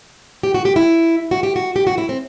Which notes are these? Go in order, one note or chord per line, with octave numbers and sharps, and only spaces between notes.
G4
F#4
G4
E4
F#4
G4
F#4
G4
F#4
E4
C4